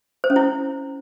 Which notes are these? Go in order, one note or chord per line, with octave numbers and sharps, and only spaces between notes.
C5
C#4
E4